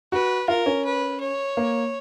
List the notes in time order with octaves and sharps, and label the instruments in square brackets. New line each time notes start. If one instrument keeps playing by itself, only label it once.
[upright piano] F#4 [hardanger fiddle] B4
[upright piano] F4 [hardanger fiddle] A#4
[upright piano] C#4
[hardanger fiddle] B4
C#5
[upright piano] A#3